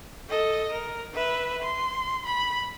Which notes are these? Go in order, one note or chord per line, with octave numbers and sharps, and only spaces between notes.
A4 D#5
A#4
B4 E5
C6
B5